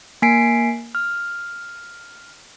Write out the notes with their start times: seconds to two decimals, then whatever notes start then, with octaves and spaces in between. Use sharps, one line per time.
0.22 A#3 G#5 B6 C7 D7
0.95 F6